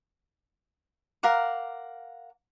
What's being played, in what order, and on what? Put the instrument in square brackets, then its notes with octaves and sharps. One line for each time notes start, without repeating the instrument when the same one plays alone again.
[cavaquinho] A#4 F5 F#5 D6